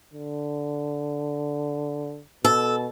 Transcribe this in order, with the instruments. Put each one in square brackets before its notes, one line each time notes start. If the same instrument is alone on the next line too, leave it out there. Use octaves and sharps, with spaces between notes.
[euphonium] D3
[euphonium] B2 [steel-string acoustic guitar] A4